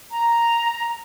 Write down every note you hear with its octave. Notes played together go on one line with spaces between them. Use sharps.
A#5